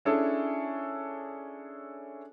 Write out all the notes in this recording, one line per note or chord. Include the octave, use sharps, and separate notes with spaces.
C#4 D4 E4 G#4 A4 C#5